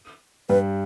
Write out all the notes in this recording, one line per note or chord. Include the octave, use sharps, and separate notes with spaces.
G2 G3 B4